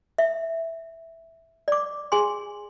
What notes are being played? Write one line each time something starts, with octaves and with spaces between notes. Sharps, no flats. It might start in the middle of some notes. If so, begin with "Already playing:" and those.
E5
D5 D6
G#4 G#5 C6